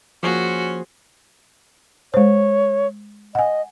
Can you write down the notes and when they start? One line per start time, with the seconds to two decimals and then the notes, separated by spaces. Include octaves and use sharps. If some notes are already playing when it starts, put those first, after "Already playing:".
0.23 F3 A#3 C#4 F#4 G#4 C5
2.14 G#3 C5 C#5
3.35 D#5 F#5 G#5